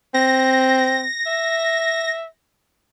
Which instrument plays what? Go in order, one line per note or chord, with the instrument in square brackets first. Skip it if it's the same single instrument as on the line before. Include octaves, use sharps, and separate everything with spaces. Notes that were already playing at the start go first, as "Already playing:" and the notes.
[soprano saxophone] C4 [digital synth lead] A#6
[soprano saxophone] E5